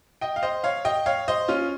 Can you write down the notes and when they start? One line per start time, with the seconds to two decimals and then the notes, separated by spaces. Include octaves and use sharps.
0.21 D#5 G5
0.36 F5
0.43 C5 D#5
0.64 C#5 F5
0.85 D#5 G5
1.06 C#5 F5
1.28 C5 D#5
1.48 C#4 F4